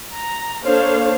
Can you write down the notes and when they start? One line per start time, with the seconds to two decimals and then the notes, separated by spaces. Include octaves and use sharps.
0.12 A#5
0.63 A#3 D4 A4 C5 C#5 F5